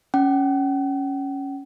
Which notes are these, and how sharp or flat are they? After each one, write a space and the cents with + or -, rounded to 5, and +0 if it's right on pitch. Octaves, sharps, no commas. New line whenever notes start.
C#4 +0 F#5 +45